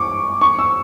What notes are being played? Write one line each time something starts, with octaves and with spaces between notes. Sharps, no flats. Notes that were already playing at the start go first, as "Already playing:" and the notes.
Already playing: C#6 D6
C#6
E6